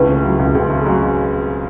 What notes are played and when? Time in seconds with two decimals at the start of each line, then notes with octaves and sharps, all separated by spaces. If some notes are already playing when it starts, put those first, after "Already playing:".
Already playing: C#2 E3 A3
0.08 C#3
0.24 F#3
0.39 C#2
0.55 C#2 C4
0.70 C#3 A3
0.86 F#3 G#3